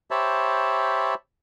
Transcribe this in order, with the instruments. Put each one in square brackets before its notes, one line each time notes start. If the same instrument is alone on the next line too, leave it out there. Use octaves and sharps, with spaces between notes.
[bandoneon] G4 C5 C#5 E5 A5 B5